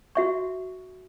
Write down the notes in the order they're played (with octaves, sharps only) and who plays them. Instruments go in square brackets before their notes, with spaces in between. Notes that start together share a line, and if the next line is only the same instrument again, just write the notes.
[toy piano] F#4 E5 C#6